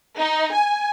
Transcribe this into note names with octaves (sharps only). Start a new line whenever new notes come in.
D#4
G#5